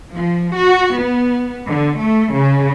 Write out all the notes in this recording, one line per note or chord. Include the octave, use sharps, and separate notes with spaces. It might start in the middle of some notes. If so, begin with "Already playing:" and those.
F3
F#4
B3
D3
A3
C#3